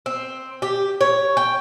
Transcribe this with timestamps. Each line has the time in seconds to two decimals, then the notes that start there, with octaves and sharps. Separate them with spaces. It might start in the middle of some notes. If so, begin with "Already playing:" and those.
0.06 C4
0.62 G4
1.01 C#5
1.37 G5